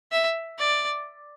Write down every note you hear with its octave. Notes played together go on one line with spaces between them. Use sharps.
E5
D5